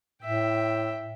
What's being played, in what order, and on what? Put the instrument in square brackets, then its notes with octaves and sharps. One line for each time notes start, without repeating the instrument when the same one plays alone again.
[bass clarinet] A2 [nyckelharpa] E5 G5